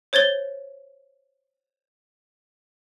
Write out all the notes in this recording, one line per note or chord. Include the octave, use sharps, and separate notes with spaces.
C5 C#5 G#6 A6 G7